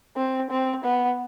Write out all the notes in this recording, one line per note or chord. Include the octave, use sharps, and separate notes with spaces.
C4
C4
B3